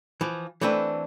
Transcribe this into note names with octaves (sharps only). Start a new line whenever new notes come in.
E3 F3
E3 A3 C4 D4 B4